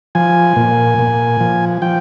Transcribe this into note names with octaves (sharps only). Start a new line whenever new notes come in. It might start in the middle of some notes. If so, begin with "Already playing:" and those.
F3 G#5
A#2
A#2
F3
F3 G5